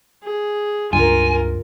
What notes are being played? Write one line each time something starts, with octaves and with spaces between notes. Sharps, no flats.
G#4
C#2 G2 F4 A#4 G#5